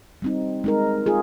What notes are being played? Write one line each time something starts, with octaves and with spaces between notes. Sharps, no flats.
G3 C4 D#4
G#3 D#4 A#4
F4 G#4